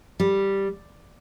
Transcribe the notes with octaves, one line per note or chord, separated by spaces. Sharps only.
G3